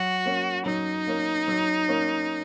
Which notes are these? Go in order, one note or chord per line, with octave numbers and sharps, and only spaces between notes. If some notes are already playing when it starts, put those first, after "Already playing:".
Already playing: F#3 F#4
A#3 C#4
F#3 D#4
A#3 C#4
F#3
A#3 C#4